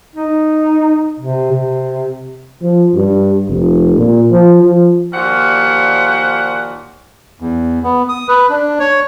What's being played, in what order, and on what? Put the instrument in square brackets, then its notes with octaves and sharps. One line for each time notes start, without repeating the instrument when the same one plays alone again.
[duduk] D#4
C3
C3
[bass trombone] F3
G2
F1
A#2
F3
F3
[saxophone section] D#2 A#2 F3 F#4 D5 F#5
[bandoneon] E2
B3
D#6
B4
D4
C#5